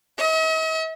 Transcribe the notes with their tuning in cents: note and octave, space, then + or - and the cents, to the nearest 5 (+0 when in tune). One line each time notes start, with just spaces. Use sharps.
D#5 +45